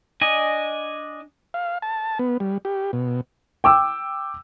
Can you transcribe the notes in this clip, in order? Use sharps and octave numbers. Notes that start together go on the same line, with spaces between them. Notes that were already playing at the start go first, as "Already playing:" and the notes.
D4 D#5 G#5
F5
A5
B3
G3
G4
B2
G5 D6 E6